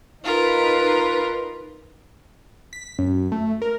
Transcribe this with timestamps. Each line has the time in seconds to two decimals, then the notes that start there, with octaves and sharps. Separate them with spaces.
0.24 D#4 F4 A#4 B4
2.73 B6
2.99 F#2
3.32 A3
3.62 A#4